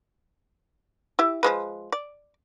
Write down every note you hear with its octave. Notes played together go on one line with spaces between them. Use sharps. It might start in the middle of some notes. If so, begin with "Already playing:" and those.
E4 G4 E5
F3 G#3 B4
D5